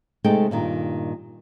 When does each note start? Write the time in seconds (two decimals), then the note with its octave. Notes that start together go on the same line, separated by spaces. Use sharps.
0.24 C3 G#3 A3 D#4 A4 G5
0.51 G2 A#2 D#3